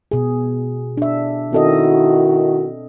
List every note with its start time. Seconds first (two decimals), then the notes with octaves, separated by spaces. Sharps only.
0.11 B2 G#4
0.97 D4 E5
1.53 D#3 C4 E4 F#4 A4 D#5